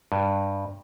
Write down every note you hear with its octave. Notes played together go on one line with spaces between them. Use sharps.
G2